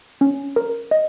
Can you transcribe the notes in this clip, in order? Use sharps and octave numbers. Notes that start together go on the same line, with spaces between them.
C#4
A#4
D#5